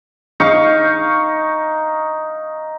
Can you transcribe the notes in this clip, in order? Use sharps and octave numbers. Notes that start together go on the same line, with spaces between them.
D#4 F5 C#6